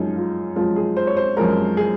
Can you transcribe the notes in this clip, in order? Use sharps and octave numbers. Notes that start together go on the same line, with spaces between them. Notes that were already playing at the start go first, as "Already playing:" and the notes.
Already playing: F#2 F3 G#3 D#4 F4
F4
F#2 F3 G#3 F4
G#4
C5
C#5
C5
F#2 F3 G#3 A#4
G#4